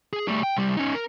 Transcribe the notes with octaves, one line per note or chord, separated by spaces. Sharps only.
G#4
G3 A3
G5
C2 G3
C#4 D#4
A#4